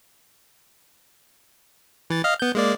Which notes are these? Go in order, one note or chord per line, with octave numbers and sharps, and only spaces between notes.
E3 A6
D#5 F5 F6
B3 G6
G#3 A#3 D5